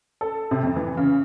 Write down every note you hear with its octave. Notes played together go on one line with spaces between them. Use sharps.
A4
C3
F2
E3
C#3